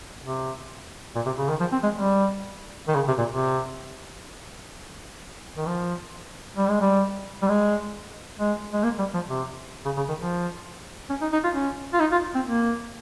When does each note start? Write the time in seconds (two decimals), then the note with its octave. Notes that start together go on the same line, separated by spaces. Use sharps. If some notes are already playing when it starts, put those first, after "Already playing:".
0.24 C3
1.15 A#2
1.26 C3
1.38 C#3
1.49 D#3
1.60 F3
1.72 C4
1.83 G#3
1.95 G3
2.88 D#3
2.96 C#3
3.08 C3
3.18 A#2
3.29 C3
5.57 D#3
5.67 F3
6.57 G3
6.69 G#3
6.81 G3
7.42 G3
7.48 G#3
8.39 G#3
8.73 G#3
8.84 A#3
8.99 G3
9.14 F3
9.30 C3
9.85 C#3
9.97 C#3
10.09 D#3
10.20 F3
11.10 C#4
11.22 D#4
11.32 D#4
11.44 F4
11.55 C#4
11.93 F4
12.00 D#4
12.12 F4
12.35 C4
12.46 A#3